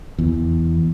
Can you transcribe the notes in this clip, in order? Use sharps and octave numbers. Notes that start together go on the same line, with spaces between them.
E2